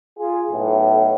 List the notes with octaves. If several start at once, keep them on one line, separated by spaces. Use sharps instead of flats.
F4 G#4
B1 A2